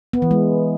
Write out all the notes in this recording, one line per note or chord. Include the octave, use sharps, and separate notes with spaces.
B3
E3
G#3